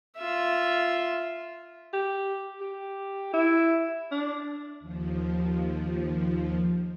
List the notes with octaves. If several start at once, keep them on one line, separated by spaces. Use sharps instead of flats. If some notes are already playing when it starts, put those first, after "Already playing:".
F4 E5
G4
G4
E4
D4
D#2 F3